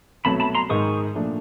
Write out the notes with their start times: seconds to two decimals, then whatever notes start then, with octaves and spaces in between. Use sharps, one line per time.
0.25 C2 B2 F#3 A3 A5 B5
0.40 A5 B5
0.55 A#5 C6
0.70 G#2 D#3 G#3 C#6 D#6
1.15 A#2 F3 A3 D4